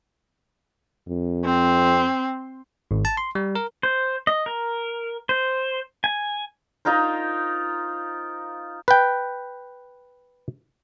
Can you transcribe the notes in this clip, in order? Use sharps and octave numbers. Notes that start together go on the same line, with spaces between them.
F2
C4
G#1
A5
C6
G3
A#4
C5
D#5
A#4
C5
G#5
D#4 F4 A#4 C5
B4 G5